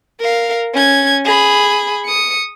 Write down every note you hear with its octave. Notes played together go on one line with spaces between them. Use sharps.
A#4 F5
C#4 G#6
G#4 B5
D#6 C#7